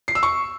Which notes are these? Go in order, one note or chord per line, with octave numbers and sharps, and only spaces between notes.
C7
E6
C#6